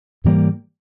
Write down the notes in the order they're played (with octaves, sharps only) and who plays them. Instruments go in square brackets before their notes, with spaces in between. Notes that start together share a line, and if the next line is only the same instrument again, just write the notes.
[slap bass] G#2 E3 G3 A#3